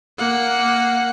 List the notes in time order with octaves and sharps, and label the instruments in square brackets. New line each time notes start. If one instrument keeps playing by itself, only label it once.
[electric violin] A#3 F#5